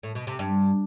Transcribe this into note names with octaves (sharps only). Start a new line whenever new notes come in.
A2
B2
C3
G2